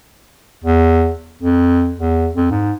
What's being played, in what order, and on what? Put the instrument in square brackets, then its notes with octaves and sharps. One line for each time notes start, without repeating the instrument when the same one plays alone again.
[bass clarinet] E2
F2
E2
F2
G#2